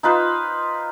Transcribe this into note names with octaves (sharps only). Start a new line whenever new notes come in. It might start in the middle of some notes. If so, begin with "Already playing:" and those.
D#4 F4 B4 C5